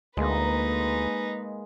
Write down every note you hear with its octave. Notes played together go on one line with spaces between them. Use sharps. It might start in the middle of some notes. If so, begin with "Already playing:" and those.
D2 G#3 A#3 D#4 B4